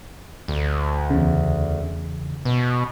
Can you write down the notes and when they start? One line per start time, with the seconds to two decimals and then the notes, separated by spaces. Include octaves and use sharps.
0.48 D2
1.10 E2 C#3
2.45 B2